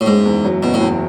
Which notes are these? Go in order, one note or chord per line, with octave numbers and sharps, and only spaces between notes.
A2
F#1 G#2
E2
F#3
F#1 B2
A2
E2